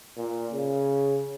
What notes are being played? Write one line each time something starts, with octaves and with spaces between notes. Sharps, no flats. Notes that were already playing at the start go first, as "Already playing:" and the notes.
A#2
C#3